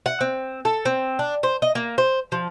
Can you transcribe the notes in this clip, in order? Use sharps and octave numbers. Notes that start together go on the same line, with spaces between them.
F#5
C4
A4
C4
D4
C5
D#5
A#3
C5
F3